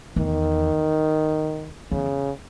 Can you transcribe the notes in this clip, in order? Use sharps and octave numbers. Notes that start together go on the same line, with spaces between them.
E2 D#3
E2 C#3